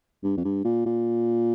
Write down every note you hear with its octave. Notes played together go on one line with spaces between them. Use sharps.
G2
F2
G2
A#2
A#2